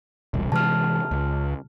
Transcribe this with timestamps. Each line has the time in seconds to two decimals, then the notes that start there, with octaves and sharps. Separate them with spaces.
0.34 E1 C2
0.52 C3 E3 G#3 A5 F6
1.11 C#2